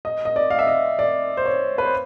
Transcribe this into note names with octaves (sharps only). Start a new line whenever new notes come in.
D#5
D#5
D5
F5
E5
D#5
D5
C5
C#5
B4
C5